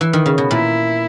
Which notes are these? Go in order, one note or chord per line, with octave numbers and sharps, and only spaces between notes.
E3
D#3
C#3
B2
A#2 E4